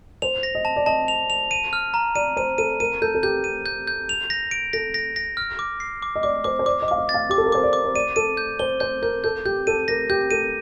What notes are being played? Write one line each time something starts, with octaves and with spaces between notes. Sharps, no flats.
C5 F7
A#6
D#5
A5
D5
D#5 A5
F7
F7
D#7
F6
A#5
D5 D#7
C5 D#7
A4 D#7
A#4 D#7
A4 G6
A4
G4 G6
D#7
G6
G6
F7
A#6
D7
A4 A#6
A#6
A#6
F6
D6
C7
D6
D#5
D5 D6
C5 D6
C5
D5 D6
D#5
F5 D6
D#5
A6
F5
G4 D6
A4
A#4
C5 D6
D5
D6
C5
D5 D#7
A4 D#7
G6
C5 G7
C5 G6
A#4 G6
A4 G6
G4 G6
A4 D#7
A#4 A#6
G4 G6
A4 D#7